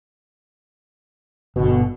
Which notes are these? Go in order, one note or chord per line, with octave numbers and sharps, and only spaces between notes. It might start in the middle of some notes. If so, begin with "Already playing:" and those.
G1 B2 D3